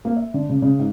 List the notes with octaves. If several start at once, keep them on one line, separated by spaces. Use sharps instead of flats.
A#3
E5
D3
C#3
C#3
G#2